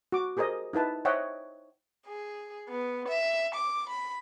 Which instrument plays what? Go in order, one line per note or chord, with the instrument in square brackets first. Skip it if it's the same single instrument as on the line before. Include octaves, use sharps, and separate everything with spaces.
[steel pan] F#4 D6
G4 G#4 A#4 C5 D#5
D#4 E4 B4 A5
C5 C#5 D#5 E5 F#5 G5
[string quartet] G#4
B3
E5
D6
B5